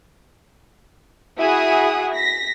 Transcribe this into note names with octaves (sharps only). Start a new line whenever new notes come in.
E4 F#4 G#4 F#5 D#6
A#6 B6